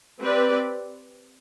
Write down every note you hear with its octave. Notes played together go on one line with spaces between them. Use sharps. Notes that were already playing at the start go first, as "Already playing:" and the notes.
C4 G4 B4 D5